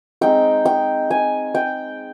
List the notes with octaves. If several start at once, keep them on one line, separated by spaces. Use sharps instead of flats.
G#3 C4 D#4 G5
G5
G#5
G5